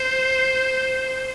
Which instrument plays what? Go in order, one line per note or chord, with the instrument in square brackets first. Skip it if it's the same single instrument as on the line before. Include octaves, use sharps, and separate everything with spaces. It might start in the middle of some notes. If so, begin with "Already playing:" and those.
Already playing: [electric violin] C5